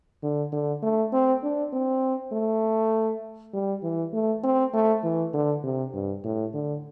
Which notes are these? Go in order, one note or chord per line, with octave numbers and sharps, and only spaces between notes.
D3
D3
A3
C4
D4
C4
A3
G3
E3
A3
C4
A3
E3
D3
C3
G2
A2
D3